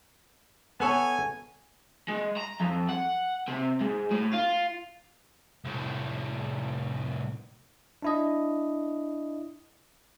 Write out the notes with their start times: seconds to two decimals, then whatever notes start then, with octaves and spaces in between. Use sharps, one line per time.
0.80 B3 A4 C#5 G#5
2.08 G#3
2.37 A#5
2.60 F2
2.89 F#5
3.48 C3
3.81 G#2
4.11 A2
4.33 F4
5.64 C2 A2
8.02 D4 E4 D#5